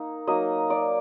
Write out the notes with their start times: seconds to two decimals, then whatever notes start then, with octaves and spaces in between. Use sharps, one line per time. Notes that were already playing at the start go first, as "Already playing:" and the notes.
Already playing: A#3 D#4
0.27 F#3 A#3 D#4 D#5
0.70 D5